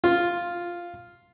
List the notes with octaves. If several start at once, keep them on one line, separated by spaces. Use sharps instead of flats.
F4